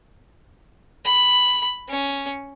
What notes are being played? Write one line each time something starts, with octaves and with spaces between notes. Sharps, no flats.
B5
C#4